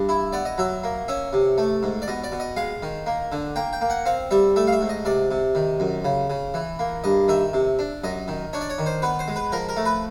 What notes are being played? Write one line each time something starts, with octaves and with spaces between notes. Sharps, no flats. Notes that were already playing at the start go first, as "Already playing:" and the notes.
Already playing: G2
E4
B3 D5
D#5
F#3 E5
A#3
C#4 E5
C3
A3
G#2
D5
B2 D#5
D5
B2
D#5
G#3 F5
D#3
A#3
D3
A#3 G5
G5
A#3
F#5
C4 F5
G3 E5
A3 E5
F5
E5
G#2
D#5
C3 D5
C3
D#3
F#2
C#3
C#3
E3
A#3
G2 D#5
D#3 E5
C3
D4
F#2 D#5
D#3
D4 C#5
D5
C#5
D#3
C5
B3 B4
C5
G#3
B4
F3 A#4
A#4
A3
B4